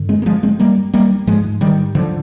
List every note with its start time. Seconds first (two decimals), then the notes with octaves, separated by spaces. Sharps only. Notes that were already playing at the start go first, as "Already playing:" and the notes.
Already playing: G2 D3
0.09 G#3 C4
0.22 A#3
0.26 F3 G#3
0.43 G#3 C4
0.60 G3 A#3
0.94 G3 A#3
1.27 G#2 F3 G#3
1.61 D#3 G3
1.95 D3 F3